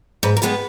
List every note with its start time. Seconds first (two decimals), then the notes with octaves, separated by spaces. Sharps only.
0.23 G#2 B4
0.37 A#4
0.42 D#3 G#3 B3 B4